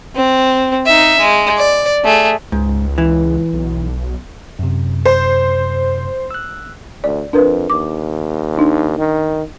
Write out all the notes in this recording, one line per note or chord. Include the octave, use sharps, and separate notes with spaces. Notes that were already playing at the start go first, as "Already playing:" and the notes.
C4
D#4 E5
G#3
D5
A3 G#4
C#2 G#2
E3
B1
F#2 C3
C5
E6 F#6
D2 D5
F2 D4 A#4 B4
D#2 D6
D4 D#4
D#3